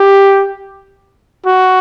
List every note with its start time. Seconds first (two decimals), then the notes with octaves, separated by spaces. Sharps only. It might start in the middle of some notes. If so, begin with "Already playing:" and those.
Already playing: G4
1.46 F#4